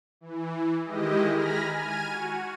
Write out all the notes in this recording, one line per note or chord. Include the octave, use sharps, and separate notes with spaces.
E3
D#3 G#3 E4 G4 D#5
G#5 A#5 B5 F6 A#6
G#5 F6 G#6 D#7
F#4